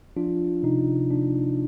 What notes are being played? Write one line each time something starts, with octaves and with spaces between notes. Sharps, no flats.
F3 D4 F4
C3 D#4
A#3 D4